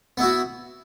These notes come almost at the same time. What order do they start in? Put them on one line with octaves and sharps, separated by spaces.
B3 E4 F#4